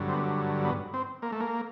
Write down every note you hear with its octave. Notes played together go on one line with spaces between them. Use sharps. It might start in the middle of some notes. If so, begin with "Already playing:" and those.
Already playing: G2 D3 F#3
C4
B3
B3
C4
A#3
A3
A#3